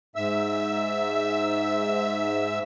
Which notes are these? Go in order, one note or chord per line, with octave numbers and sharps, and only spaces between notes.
G#2 E5 E6